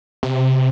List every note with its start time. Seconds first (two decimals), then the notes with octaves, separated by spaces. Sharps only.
0.23 C3